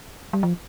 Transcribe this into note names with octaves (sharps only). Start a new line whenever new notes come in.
G3
F3